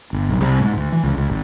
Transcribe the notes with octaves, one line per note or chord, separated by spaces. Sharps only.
G1
B1
C2
G#2
D2
E3
C#2
C#2
G#1